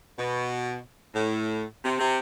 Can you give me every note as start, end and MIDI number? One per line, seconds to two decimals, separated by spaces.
0.18 0.78 47
1.15 1.64 45
1.85 1.96 48
1.99 2.19 48